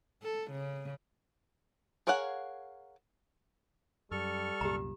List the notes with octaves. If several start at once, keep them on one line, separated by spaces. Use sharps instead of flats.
A4
C#3
G#4 A#4 C#5 F5 F#5
F#2 G3 A4 C#6 F6
C2 F#2 A#2 G4 A#5